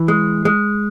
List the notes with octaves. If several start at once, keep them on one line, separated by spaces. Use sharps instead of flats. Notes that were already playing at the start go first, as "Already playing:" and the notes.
Already playing: E3
G#3
G#3